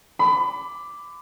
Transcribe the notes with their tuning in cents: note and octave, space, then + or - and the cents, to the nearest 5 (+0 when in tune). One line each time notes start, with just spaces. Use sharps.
B5 +30 D6 +0